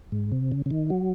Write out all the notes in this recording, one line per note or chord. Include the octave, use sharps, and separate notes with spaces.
G#2
C3
C#3
C#3
D#3
F#3